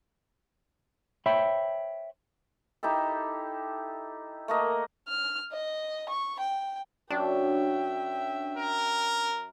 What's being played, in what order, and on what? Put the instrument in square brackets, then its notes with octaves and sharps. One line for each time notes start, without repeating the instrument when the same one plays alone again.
[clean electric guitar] C5 C#5 E5 G5 B5
[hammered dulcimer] D#4 E4 G4 A4
A3 A#3 D#5
[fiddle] F6
D#5
C#6
G5
[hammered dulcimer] F#2 [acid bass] D4 [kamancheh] E5 G5
[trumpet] A#4